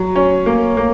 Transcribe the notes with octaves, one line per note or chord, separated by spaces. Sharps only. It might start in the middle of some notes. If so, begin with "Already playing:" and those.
Already playing: F#3
C#4
A#3
A#3